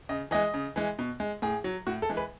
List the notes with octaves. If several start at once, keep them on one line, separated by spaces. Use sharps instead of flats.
C#3 D#5
E3 G#3 D#5
C#3
E3 G#3
B2
G#3
A2 G#4
F#3
A2 F#4
A4
E3 G#3
B4